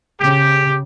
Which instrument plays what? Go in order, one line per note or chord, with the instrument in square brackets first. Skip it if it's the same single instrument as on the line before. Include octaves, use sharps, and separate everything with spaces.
[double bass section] C#3 [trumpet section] G4